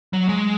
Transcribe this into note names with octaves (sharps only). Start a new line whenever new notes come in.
F#3
G#3